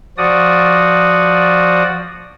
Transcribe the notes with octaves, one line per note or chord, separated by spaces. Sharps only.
F3 F#4 D5 D#6